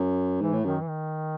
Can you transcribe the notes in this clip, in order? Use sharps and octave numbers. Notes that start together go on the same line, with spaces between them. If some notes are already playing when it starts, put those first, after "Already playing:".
Already playing: F#2
G#2 E3
A2
F#2 D#3
E3
D#3